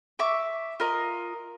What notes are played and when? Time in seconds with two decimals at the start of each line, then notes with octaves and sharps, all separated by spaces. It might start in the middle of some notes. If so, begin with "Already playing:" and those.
0.19 E5 C#6 D6
0.80 F4 A#4 D#5